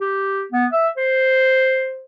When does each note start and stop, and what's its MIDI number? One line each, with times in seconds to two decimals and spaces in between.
0.01 0.45 67
0.52 0.66 59
0.72 0.88 76
0.97 2.05 72